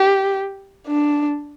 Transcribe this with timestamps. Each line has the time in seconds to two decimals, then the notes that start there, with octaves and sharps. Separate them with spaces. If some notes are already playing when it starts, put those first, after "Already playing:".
Already playing: G4
0.87 D4